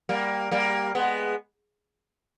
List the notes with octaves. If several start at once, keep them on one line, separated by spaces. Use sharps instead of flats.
G3 A#3
G3 A#3
G#3 B3